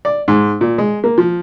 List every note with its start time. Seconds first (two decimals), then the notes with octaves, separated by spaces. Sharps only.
0.05 D5
0.28 G#2
0.61 A#2
0.78 G#3
1.04 A#3
1.18 F3